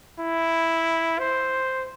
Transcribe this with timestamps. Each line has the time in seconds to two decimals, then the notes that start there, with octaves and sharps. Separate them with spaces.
0.20 E4
1.19 C5